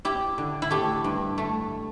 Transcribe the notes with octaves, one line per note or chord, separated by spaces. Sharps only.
E4 G4
D3
E4
A3 G4
G2
A3